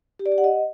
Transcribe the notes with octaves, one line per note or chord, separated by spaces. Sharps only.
G4
D5
G4
F#5
D#5